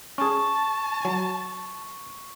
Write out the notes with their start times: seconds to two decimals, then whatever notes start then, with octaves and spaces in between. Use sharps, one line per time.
0.18 C#4 G#4 A5 C#6
1.05 F#3